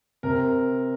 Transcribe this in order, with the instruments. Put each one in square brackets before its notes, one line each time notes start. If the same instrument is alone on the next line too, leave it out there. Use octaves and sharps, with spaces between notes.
[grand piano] C3 A#4